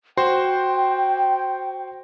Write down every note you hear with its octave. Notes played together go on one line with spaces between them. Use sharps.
F#4 C5 G5 C6